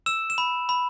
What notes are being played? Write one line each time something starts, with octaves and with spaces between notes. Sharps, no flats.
E6 E7
E7
B5
B5